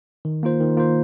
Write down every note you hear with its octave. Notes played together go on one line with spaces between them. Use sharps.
D#3
A#3 F4 C5
D#3
A#3 F4 C5